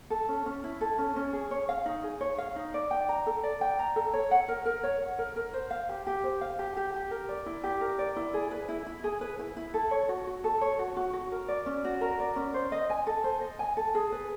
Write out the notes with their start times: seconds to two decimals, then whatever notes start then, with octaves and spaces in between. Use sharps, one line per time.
0.10 A4
0.28 C#4
0.46 C#4
0.64 E4
0.81 A4
0.98 C#4
1.16 C#4
1.33 G#4
1.51 C#5
1.69 F5
1.86 D#4
2.03 G#4
2.21 C#5
2.38 F5
2.56 D#4
2.74 D5
2.91 G5
3.09 A#5
3.26 A4
3.43 D5
3.61 G5
3.79 A#5
3.96 A4
4.13 C#5
4.31 F#5
4.48 A#4
4.65 A#4
4.83 C#5
5.02 F#5
5.18 A#4
5.36 A#4
5.53 C5
5.71 F5
5.89 G4
6.07 G4
6.24 C5
6.41 F5
6.59 G4
6.77 G4
6.94 G4
7.11 A#4
7.29 D5
7.46 E4
7.64 G4
7.81 A#4
7.99 D5
8.16 E4
8.34 G#4
8.51 B4
8.69 E4
8.86 E4
9.04 G#4
9.21 B4
9.39 E4
9.57 E4
9.74 A4
9.91 C#5
10.09 F#4
10.27 F#4
10.44 A4
10.61 C#5
10.79 F#4
10.97 F#4
11.13 F#4
11.32 A#4
11.48 D5
11.66 C#4
11.84 F#4
12.01 A#4
12.20 D5
12.36 C#4
12.54 C5
12.72 D#5
12.90 G#5
13.07 A4
13.24 C5
13.41 D#5
13.59 G#5
13.77 A4
13.95 G#4
14.12 B4